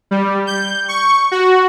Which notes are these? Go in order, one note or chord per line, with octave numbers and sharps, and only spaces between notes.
G3
G6
C#6
F#4